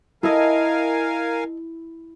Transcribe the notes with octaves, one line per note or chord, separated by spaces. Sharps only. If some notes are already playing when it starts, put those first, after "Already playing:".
E4 A4 A#4 D#5 F5 G#5